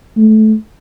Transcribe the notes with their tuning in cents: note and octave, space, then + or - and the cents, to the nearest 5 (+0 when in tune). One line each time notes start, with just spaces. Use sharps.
A3 -20